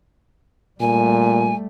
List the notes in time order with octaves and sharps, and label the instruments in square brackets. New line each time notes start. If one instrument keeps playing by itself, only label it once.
[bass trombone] A#2 [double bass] G3 A3 [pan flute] G#5